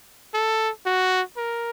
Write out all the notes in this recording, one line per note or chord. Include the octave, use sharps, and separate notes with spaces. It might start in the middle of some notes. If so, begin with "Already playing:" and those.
A4
F#4
A#4